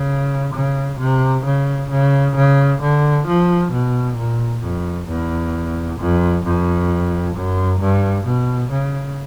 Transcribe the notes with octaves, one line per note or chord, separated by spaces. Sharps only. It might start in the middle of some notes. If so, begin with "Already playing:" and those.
Already playing: C#3
C#3
C3
C#3
C#3
C#3
D3
F3
B2
A#2
F2
E2
F2
F2
F#2
G2
B2
C#3